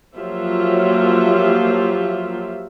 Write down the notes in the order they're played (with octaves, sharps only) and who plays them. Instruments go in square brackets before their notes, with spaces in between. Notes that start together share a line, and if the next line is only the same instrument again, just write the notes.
[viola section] F3 F#3 A#3 F4 G4 E5